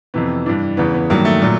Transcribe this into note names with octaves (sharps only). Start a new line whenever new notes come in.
F2 C3 E3 B3
G2 E3 D4
E2 C#3 E3 B3
B3
G2 D#3 F#3 A#3
A3
A#2 F#3 A3